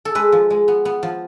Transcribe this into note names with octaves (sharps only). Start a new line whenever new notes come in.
A4
G#3 B4
F3
G#3
B3
B3
F3